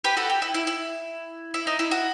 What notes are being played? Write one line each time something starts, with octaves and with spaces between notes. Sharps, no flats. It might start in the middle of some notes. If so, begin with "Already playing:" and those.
G4 B4
F#4 A4
G4
E4
E4
E4
E4
D#4
E4
F#4